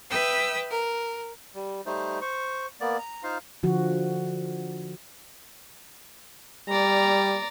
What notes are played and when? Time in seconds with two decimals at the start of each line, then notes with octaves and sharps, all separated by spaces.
0.10 B4 E5 G5 D#6 E6
0.71 A#4
1.54 G3
1.86 G3 A3 D#4 C5
2.21 C5 C#6
2.81 A#3 B3 D5
2.98 A#5
3.23 D#4 F4 C5 F5
3.63 D3 F3 F#4
6.69 G3 D5 A#5